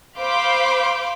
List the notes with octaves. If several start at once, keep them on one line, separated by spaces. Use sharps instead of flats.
C5 F5 B5 C6 D6 G6